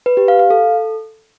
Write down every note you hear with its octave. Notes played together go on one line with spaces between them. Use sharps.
B4
G4
F5
F5
A4